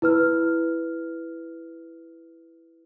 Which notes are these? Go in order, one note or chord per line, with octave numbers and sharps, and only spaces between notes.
E4 B4 F6